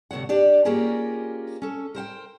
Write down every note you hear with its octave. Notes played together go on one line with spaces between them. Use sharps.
D2 C3 E3 C#5 F#5
D4 G4 D5
A#3 C#4 F4 G4 G#4 A#4
C#4 A4
A#4 C5 F#5 G5